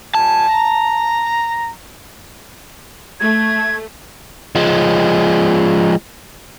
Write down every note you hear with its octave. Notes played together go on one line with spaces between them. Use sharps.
A#2 G3 G#5 A5
A#5
A3 G#6
F3 G#3